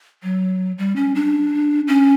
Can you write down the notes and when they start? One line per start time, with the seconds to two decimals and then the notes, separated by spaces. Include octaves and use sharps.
0.23 F#3
0.78 G3
0.96 C#4
1.15 D4
1.88 C#4